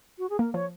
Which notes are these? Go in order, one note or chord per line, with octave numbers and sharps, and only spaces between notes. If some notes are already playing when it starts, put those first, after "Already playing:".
F#4
G#4
A#3 A#4
F3 C#5